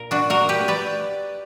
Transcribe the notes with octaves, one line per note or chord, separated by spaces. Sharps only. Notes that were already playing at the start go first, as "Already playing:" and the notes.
Already playing: A#2 A#4
D4 F#4
F#4 A#4
G4 B4
B4 D5